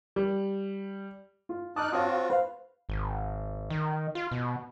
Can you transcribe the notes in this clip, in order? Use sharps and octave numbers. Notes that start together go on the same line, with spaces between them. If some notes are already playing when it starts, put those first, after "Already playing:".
G3
F4
D#4 A5 D6 D#6 F6 F#6
C4 F4 F#4 C#5 F5 D#6
B4 C5 F5
G#1
D#3
F4
B2